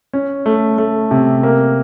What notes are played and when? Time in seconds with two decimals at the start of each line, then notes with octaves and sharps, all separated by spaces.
0.13 C#4
0.46 A3
0.78 A3
1.11 C3
1.43 A#3